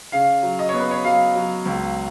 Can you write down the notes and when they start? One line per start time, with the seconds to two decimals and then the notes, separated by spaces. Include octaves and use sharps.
0.12 C#3 F5
0.43 F#3
0.59 D#5
0.69 B3 C#5
0.80 B4
0.91 C#5
1.05 F#3 F5
1.35 F#3
1.66 C#2